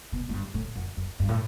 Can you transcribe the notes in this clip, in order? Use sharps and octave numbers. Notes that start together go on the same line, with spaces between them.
B2
A2
G2
A2
F#2
F#2
G2
A2